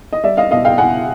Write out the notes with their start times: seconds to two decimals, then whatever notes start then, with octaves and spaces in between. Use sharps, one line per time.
0.13 D#5
0.24 G3 D5 E5
0.37 D#5 F5
0.51 B2 D#5 F5
0.65 F5 G5
0.78 B2 F#5 G#5